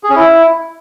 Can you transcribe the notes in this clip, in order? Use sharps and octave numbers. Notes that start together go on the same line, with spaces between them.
G#4
C#4
E4